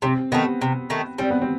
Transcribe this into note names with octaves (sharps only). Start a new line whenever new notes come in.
C3 C4
D#3 A3 B3
C3
D#3 A3
G3 C4
B3
C4